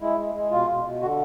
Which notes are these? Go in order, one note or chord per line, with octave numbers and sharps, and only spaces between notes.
G#3 E4
G#3
G#3
B2 F4
B2
B2
D3 F#4